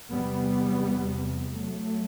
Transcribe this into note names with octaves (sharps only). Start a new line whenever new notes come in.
E2 C3 G3 B3
F#3 A3